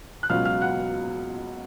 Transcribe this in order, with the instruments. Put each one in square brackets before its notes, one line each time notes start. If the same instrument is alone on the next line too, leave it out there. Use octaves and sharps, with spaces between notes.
[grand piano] F#6
C#2 B2 F#3 C#4 F4 F5 F6
F5 F6
F#5 F#6